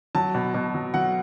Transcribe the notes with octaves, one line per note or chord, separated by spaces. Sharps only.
F#3 A5
B2
B2
F#3
F#3 F#5